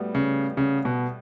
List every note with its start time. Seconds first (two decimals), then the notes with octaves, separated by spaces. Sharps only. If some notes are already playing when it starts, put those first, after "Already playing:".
Already playing: A2 G3 B3 F#4
0.15 C#3
0.57 C#3
0.85 B2